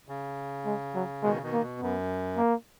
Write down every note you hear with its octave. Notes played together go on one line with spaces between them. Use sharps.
C#3
G#3
F#3
B2 D#3 G#3
C#3
B2 D#3
A#3
B2
F#2 B3
A#3